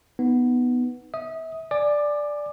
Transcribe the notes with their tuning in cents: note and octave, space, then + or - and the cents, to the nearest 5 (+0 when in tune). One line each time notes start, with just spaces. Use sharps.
B3 +0 D#4 +0
E5 -30 D#6 +0
D5 +0 G#5 +0 D6 +20